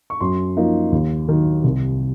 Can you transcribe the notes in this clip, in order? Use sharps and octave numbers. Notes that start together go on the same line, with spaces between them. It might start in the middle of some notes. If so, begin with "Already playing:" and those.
C#6
F#2 C6
F3 A#3 D#4
D#2
D#3 F#3
C2